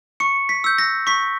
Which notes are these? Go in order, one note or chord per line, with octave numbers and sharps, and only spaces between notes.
C#6 C#7
B6
E6 G6
A#6
C#6 B6